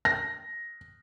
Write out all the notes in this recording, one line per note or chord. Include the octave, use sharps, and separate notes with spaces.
A#6